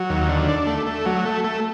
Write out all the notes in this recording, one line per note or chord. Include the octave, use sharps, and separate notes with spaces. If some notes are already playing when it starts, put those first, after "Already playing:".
Already playing: F#3
D#2
D3
D4
A3
A3
F#3
A3
A3